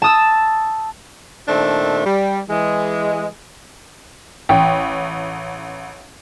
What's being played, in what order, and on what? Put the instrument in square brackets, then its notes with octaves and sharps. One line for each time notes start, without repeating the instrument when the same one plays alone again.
[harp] A5 D#6 E6
[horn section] A#2 D#3 A3 C4 D4
G3
E3 G#3
[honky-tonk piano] A1 [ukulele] G5